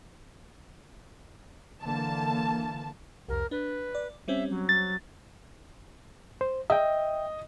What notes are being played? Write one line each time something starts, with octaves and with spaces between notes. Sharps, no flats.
D3 E3 A#3 A5
C2 F2 A#4
D4 B4
D5
G3 C4 C#4 E5
F#3
A6
C5
D#5 E5 G5